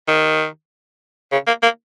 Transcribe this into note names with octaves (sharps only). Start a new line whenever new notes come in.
D#3
C#3
A#3
A#3